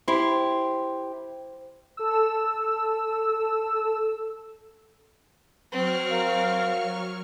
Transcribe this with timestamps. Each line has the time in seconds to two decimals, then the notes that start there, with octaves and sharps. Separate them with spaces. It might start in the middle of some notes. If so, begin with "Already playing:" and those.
0.08 E4 G4 C5 C6
1.97 A4 E6
5.72 F#3 C4 C#6 F6
6.11 A#4 F5